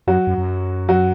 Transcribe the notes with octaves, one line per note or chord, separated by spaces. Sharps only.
F#2 F#3 F#4
F#2
F#2
F#3 F#4